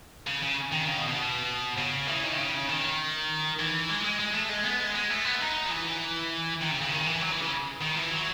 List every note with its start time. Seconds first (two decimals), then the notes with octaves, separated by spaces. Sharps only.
0.27 C#3
0.43 C#3
0.73 D#3
0.88 C#3
0.98 B2
1.08 B2
1.78 C#3
2.08 E3
2.23 D#3
2.38 C#3
2.69 D#3
3.59 E3
3.90 G#3
4.04 G#3
4.19 G#3
4.34 A3
4.50 G#3
4.65 B3
4.80 G#3
4.95 G#3
5.10 A3
5.25 B3
5.40 D#4
5.65 F#3
5.71 E3
6.61 D#3
6.71 C#3
6.81 C#3
6.91 D#3
7.06 E3
7.21 F#3
7.32 E3
7.41 C#3
7.82 D#3
7.96 E3
8.12 F#3